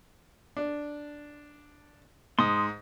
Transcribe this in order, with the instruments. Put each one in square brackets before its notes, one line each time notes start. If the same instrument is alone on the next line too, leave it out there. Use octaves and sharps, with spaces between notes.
[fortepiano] D4
[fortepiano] G#2 [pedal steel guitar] C6 D#6